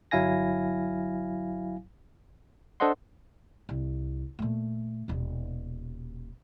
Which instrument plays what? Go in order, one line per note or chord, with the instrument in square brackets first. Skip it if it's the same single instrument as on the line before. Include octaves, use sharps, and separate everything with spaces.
[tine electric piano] G1 F#3 E4 F5 G#5 A#6
D4 A4 C5 D#5 F#5 C6
[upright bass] C2
A#2 A3
D#1 B2